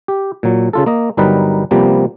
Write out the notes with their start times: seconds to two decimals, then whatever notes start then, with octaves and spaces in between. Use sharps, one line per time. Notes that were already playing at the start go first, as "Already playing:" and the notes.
0.08 G4
0.43 A#2 F#3
0.73 C#3 F4 A4
0.86 A#3 D#5
1.17 G1 F#3 G3 D#4 A#4 B4
1.71 C3 F3 G3 A#3 B3